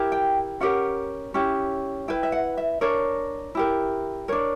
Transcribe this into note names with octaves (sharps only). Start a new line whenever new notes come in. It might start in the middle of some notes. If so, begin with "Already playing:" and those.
Already playing: E4 G4 A#4
G5
C#4 G4 A#4 F#5
C#4 E4 G4
E4 B4 G5
E5
F#5
E5
D4 A#4 C#5
E4 G4 A#4
D4 A#4 C#5